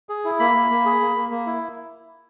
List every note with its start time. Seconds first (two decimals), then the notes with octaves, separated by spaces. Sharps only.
0.09 G#4
0.25 E4
0.40 A#3 B5
0.54 A#3
0.70 A#3
0.86 G#4
1.00 A#3
1.16 A#3
1.31 A#3
1.46 E4